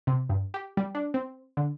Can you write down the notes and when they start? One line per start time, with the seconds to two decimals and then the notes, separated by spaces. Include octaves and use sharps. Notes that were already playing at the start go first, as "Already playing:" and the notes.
0.07 C3
0.29 G2
0.54 G4
0.77 G3
0.95 D4
1.14 C4
1.57 D3